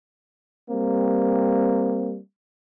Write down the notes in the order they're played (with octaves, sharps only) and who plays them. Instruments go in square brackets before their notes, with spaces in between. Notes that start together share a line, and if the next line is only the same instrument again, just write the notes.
[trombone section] G3 A#3 C4